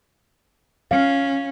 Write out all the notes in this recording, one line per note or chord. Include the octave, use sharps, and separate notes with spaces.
C#4 F5